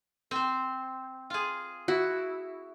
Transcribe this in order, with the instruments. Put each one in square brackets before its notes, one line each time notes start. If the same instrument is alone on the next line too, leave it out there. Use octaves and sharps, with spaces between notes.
[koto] C4 C5
F4 G#4
[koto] E4 [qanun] F#4